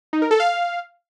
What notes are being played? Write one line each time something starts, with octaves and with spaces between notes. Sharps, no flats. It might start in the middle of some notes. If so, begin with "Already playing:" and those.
D#4
A#4
A4
F5